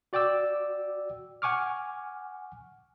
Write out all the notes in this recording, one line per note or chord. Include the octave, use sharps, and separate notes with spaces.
F#4 D5 G5 D6 E6
F#5 G#5 C#6 D6 F6